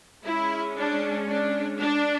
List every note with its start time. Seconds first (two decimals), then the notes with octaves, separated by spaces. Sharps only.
0.24 G#3 C#4 E4
0.76 D4
1.27 D4
1.80 D4